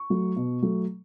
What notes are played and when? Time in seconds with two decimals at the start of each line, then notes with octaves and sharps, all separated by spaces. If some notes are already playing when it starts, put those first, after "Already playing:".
Already playing: C#6
0.10 F#3 A3
0.36 B2
0.62 F#3 A3